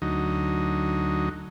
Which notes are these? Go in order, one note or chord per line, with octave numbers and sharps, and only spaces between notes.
D2 F#3 D#4